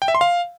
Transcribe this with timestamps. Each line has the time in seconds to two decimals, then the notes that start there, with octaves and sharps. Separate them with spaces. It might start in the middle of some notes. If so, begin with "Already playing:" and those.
0.02 G5
0.08 E5
0.15 C6
0.21 F5